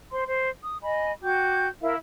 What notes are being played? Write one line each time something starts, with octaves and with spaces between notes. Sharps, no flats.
C5 C6
C5
D#6
D#5 G#5 B5
F#4 G5 D6 G6
E4 A#4 E5 F5